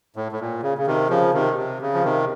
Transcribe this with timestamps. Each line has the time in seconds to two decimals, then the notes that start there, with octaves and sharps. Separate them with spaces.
0.16 A2
0.32 A2
0.40 A#2
0.62 C#3
0.78 C#3
0.87 C3 D#3
1.10 C#3 F3
1.33 C3 D#3
1.57 C3
1.81 C#3
1.93 F3
2.04 C3 D#3